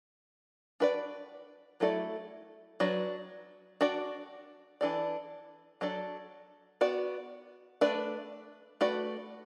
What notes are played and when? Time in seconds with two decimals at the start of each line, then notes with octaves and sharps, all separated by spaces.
0.80 D4 F#4 B4 D5
1.80 F#3 A3 E4 A4 D5
2.80 F#3 D4 B4 D5
3.81 D4 F#4 D5
4.81 E3 D4 A4 D5
5.81 F#3 D4 A4 D5
6.81 B3 F#4 D5
7.81 A3 D4 B4 D5
8.81 A3 F#4 B4 D5